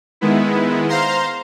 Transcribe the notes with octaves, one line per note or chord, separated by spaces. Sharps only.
D#3 G#3 B3 E4
C5 F5 A#5 C6